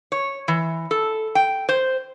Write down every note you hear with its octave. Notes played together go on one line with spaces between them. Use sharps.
C#5
E3
A4
G5
C5